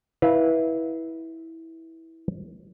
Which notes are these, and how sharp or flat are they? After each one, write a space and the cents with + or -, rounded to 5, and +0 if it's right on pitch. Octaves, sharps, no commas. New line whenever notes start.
E4 -15 B4 -20 F5 -5